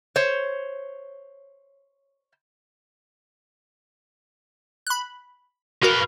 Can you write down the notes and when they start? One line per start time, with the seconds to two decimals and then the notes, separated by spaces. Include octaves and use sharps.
0.16 C5 C#5
4.87 B5 F#6
5.83 F#4 A#4 B4 F5